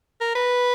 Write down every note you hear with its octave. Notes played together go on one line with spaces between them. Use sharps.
A#4
B4